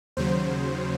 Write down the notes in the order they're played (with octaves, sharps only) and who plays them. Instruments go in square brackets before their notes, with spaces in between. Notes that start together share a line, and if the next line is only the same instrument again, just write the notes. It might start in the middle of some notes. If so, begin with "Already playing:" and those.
[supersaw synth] D#2 C#3 F#3 C5